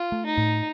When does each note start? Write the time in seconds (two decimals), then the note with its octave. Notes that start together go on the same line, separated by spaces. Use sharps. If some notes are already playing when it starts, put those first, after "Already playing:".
Already playing: F4
0.12 A3
0.26 D#4
0.38 A2